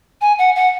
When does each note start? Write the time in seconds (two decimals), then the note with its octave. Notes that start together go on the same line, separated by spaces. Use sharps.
0.21 G#5
0.39 F#5
0.56 F#5